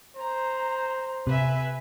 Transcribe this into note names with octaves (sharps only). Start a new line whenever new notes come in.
C5 A#5
C3 B4 E5 G#5